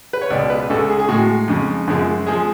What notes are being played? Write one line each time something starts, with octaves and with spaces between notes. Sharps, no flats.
B4
C#5
C#2 B2 G#3 D5
B4
C#2 C#3 G#3 A4
G#4
G#4
A2 G#3 F#4
F2 C#3 G#3
F#2 C#3 F3 G#3
F3 G#3 G#4